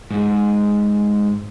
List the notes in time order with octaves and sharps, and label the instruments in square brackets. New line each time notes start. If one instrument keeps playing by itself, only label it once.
[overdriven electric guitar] G#2